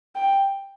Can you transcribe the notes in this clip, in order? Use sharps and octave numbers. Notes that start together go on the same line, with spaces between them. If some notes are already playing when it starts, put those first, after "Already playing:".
G5